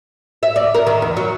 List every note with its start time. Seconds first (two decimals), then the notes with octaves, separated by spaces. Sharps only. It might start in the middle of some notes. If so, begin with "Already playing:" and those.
0.43 E5
0.56 D5
0.74 A#4
0.87 D#3
1.02 E2
1.17 F#3